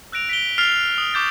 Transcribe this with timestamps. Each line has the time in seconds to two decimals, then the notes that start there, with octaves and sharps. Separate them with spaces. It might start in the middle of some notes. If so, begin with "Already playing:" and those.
0.12 E6 F#6 A#6 D7 F7
0.29 B6 D7 G7
0.58 F6 A6 C7 F7 G7
0.98 D#6
1.14 C#6 D6 G6 A6